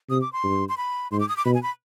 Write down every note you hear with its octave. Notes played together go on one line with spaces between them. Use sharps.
C3 D#6
D6
C6
G2
C6
B5
G#2 C6
D6
D#6
D6
B2 B5
G#5
B5